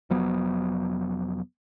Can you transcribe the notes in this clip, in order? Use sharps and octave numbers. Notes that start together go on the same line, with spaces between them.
F1 F3 F#3 B3